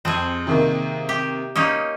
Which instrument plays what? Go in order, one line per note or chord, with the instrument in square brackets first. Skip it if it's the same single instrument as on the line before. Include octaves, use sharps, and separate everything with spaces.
[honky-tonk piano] F2 [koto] C4 G#4
[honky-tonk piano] C3 D#3 A#3
[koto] G4
[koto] A#3 C#4 D#4 [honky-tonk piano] D#6 G6